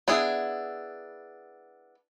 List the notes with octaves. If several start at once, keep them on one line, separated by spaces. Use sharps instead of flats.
B3 D4 E4 G#4